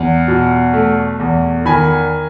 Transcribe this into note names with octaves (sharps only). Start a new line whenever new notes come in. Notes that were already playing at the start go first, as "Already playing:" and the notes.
Already playing: E2
B2
A3
E2
D#3 G#5 B5